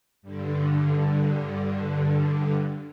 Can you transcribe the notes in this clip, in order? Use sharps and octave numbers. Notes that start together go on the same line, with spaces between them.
G2 D3